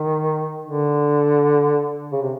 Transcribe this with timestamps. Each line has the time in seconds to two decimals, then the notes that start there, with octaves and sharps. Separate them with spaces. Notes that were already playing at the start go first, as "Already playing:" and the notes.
Already playing: D#3
0.65 D3
2.12 C#3
2.22 C3